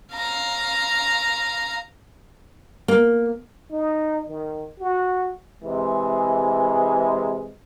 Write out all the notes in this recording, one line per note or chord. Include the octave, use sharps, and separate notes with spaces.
F5 A#5
A#3
D#4
D#3
F#4
C3 E3 G#3